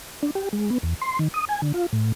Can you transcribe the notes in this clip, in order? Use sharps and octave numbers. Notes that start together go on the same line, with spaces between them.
D4
G4
G#3
B3
E2
C6
D#3
D#6
G#5
D3
F4
A2